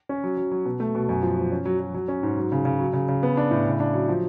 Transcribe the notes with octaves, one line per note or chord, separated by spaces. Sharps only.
C#4
F#3
F#3
F#3
B2
A3
B2
F#2
F3
F3
C#4
F#3
F#3
F#3
C#4
G#2
F#3
C#3
C#3
F#3
C#3
C#3
B3
D4
A2
C#3
D4
F#3
F3